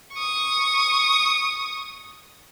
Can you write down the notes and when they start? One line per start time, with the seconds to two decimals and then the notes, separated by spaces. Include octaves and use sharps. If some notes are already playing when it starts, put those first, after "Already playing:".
0.14 C#6 D#6